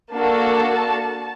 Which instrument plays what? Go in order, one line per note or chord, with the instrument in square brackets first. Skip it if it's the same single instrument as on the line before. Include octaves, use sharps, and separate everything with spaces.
[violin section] A#3 D4 F#4 A4 A5